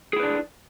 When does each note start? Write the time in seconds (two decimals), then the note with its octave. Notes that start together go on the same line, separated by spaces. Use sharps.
0.13 G#4
0.16 E4
0.20 B4
0.23 D4